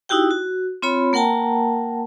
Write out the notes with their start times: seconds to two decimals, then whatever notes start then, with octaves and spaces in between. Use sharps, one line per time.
0.09 D#4 E4 F#4 G4 G5
0.31 F#4
0.82 C4 F4 C#5 B5
1.13 A#3 A#4 F#5 G5 A5 A#5